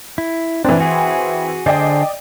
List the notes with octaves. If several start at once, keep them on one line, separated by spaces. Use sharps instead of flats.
E4
E3 C4 D4
F#4 G#4
D3 G#4 C5 D5 D#5 G5